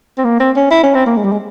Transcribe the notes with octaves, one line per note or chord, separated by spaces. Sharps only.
C4
A#3
C4
C#4
E4
C#4
C4
A#3
G#3
G3
G#3